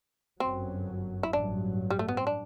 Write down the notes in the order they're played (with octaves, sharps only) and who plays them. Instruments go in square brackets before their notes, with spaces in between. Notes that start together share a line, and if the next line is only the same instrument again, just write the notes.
[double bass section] G1 F#2 F#3 [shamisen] C4
[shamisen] E4
[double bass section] A1 G2 F#3 [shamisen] D4
[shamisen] G3
A3
B3
C4
D4